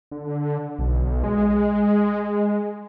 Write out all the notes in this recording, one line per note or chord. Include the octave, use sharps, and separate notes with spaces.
D3
B1
G#3